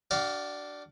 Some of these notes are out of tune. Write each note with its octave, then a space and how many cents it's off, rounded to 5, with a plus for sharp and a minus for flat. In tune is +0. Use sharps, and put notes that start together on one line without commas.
D4 +0 F#4 +40 F5 +0